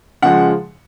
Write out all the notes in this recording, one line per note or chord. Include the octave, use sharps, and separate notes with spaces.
C#3 F3 G#3 F#5